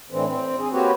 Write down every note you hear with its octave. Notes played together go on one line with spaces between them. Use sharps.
A2 D3 E3 C4
C4
G#4
A#3 C4 F#4 G4 B4 C#5